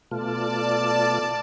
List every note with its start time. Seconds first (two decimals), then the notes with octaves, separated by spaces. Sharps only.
0.11 B2 A3 F4 D5 A5